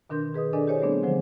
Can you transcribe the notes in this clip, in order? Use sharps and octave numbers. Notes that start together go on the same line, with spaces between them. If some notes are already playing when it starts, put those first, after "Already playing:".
B2 D#3 D4 A#4 C6 G6
G#4 B4 D#5 D#6
D4 A4 A#4 D5 D#5 G#5
E4 G4 C5 C#5 D#5 G#5
G3 A3 B3 C4 D4 G#4
D3 F3 F#3 C5